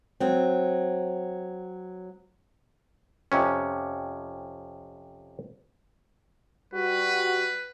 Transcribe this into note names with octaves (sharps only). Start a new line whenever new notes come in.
F#3 C4
F2 C3 C#4
G3 F#4 B4